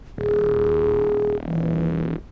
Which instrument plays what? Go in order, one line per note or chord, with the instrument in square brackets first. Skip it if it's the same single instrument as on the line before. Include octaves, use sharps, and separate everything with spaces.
[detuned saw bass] D#1 [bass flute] G#4
[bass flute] E3